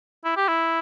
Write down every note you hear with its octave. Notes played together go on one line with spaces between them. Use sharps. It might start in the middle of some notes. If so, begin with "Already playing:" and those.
E4
G4
E4